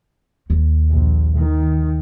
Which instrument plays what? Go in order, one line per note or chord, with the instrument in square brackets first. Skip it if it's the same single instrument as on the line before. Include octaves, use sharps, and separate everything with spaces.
[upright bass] D#2
[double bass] A#1
D#3